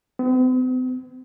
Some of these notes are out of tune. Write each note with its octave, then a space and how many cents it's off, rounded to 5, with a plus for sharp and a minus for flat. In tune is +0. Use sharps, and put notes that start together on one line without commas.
C4 -45